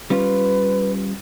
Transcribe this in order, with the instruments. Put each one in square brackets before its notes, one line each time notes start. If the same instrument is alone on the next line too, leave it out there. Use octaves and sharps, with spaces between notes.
[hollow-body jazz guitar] G3 C#4 F4 [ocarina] B4